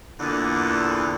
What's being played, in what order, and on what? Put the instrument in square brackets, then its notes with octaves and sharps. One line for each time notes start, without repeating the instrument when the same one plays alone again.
[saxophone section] E2 A#2 D3